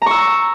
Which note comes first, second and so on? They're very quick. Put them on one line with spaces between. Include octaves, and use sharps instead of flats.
A#5 C#6 E6